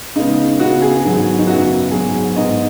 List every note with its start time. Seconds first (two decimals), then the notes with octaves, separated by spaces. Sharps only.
0.16 C#3 G#3 B3 D#4
0.59 C#3 B3 F#4
0.82 G#4
1.04 G#2 D#3 F#3 B3
1.38 D#4
1.47 F#2 C#3 B3 F#4
1.91 G#2 F#3 B3 G#4
2.36 G#2 G#3 B3 D#5